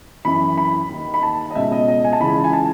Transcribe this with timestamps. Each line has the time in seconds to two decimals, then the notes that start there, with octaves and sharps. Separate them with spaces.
0.25 F#2 E3 B5
0.58 B5
0.90 D#2 D#3
1.14 B5
1.23 A5
1.51 D#5
1.55 C#2 B2 E5
1.72 D#5
1.88 D#5
2.04 G#5
2.13 A5
2.20 C#2 C#3 E3 B5
2.44 G#5
2.53 A5